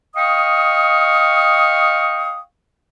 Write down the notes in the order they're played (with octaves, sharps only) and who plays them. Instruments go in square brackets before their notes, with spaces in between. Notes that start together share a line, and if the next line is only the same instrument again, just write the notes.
[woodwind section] D#5 F5 G5 C#6 D#6